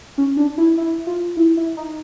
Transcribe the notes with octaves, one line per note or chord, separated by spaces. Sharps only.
C#4
D4
E4
E4
F4
E4
E4
D#4